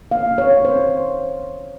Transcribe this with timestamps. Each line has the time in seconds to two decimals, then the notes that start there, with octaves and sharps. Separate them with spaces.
0.11 A#3 F5
0.31 C#4
0.38 C#5
0.51 A#3
0.65 C5
0.72 D#3